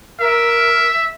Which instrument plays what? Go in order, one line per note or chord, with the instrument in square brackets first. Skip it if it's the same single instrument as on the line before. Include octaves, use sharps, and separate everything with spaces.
[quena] A#4 [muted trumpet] E5